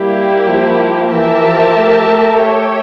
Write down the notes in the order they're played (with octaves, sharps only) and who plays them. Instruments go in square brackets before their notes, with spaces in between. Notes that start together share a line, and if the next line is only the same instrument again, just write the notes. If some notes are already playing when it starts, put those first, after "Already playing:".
Already playing: [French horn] G3 [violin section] A#3 E4 G4
[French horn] F3
[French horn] E3 [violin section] G4 A#4 E5 A5
[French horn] F3
A3
A3
[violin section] G4 C#5 E5 G5